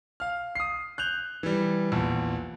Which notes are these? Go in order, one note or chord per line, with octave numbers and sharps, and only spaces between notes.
F5 F6
D#6 C7
F#6 G6 F7
E3 G3
A#1 E2